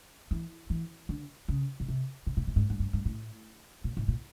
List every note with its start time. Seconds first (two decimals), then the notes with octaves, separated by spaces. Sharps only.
0.31 E3
0.70 E3
1.09 D3
1.48 C#3
1.80 B2
1.88 C3
2.27 B2
2.37 A#2
2.47 A2
2.56 G#2
2.70 G#2
2.80 G2
2.93 G#2
3.05 A2
3.84 A#2
3.97 A2
4.08 A#2